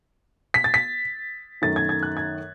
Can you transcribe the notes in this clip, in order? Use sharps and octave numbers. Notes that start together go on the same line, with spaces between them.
B6
A6
B6
F#2 D#3 A3 A6
G#6
G#6
F#6
G#6